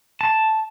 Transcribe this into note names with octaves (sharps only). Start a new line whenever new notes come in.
A5